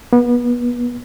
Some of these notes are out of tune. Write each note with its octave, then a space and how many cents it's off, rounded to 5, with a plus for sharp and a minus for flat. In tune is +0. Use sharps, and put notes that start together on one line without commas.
B3 -30